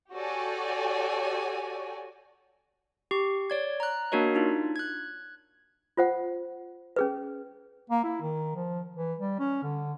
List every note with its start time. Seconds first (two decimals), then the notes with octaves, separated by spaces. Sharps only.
0.12 F#4 G4 A4 C#5 D5 G#5
3.11 G4 C#6
3.50 C#5 D5 G#6
3.80 A#5 F#6
4.12 A#3 D4 F#4 A#4 C#5 D#5
4.35 D4 D#4 F4
4.76 F#6 G#6
5.97 F4 C5 F#5
6.96 C#4 G#4 B4
7.90 A#3
8.04 E4
8.21 D#3
8.56 F3
8.96 E3
9.19 G3
9.39 C#4
9.63 D3